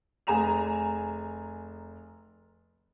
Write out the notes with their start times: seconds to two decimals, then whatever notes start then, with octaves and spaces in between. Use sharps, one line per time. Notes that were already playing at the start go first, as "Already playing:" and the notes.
0.27 F1 G#4 G#5 A#5 E7 F7